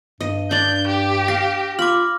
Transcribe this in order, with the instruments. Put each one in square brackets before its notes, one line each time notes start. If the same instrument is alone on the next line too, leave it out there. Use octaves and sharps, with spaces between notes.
[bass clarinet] G2 [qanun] D#5
[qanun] D4 D5 [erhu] G6
[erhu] G4
[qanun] F5 [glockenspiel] A#6
[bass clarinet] F4 [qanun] B5 [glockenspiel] D6 F6